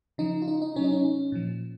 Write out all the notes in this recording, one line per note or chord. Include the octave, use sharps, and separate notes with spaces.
C#3 F3 D#4
F4
D#4
D#4
C3 F#3 C#4
D#4
C#4
A#2 F3